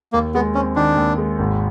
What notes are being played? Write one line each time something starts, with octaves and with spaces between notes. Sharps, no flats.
D#2 A#3
G#3 B3
C4 C#4
D#3 D4
D#2
G#3
G#1